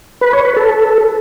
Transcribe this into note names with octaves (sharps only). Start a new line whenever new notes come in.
B4
C#5
B4
A4